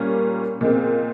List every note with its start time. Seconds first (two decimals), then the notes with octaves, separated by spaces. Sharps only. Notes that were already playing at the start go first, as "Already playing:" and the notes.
Already playing: A#2 G3 A#3 C#4
0.61 A#2 G#3 C4